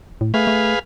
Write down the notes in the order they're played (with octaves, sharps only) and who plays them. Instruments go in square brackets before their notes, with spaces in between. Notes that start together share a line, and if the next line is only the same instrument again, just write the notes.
[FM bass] A2
[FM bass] A3 [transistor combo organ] G#4 B4 F5
[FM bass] A3